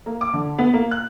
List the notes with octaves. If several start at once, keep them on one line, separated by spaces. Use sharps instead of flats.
A#3
D6
D3
B3
A#3
F#6